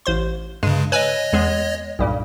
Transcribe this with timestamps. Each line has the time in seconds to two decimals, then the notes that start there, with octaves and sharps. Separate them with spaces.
0.06 A1 C5 C6
0.63 G2 C#3 G#3
0.92 B4 C#5 D#5 G#5 E6
1.33 E2 G#3 B3
1.99 B1 G2 A#2